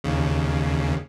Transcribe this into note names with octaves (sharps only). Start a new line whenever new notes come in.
D#2 C#3